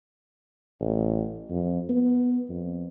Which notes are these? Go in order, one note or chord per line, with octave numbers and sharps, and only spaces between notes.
A1
F2
B3
F2